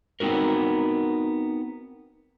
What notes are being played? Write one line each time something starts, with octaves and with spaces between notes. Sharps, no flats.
B3 C4 D#4 F#4 A#4